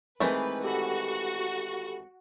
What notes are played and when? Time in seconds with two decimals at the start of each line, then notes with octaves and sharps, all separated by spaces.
0.20 D#3 E3 G#3 A3 C4 G#4 B4 G6
0.64 F#4 G4 A4 B5